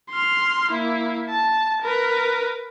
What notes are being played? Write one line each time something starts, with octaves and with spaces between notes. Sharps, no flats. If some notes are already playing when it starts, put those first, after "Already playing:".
C6 F6
A#3 E4
A5
A#4 B4